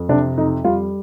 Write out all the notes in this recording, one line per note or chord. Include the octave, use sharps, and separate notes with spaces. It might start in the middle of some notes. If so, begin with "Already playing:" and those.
Already playing: F2
C3 D4
F2 D#4
G3 F4